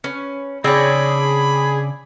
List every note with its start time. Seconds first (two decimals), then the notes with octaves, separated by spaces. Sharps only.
0.04 C#4 B4
0.64 C#3 C4 D4 G#4 C#5 D5 B5